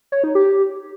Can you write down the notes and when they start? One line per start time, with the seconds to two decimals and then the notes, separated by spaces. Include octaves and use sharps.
0.12 C#5
0.24 D#4
0.35 G4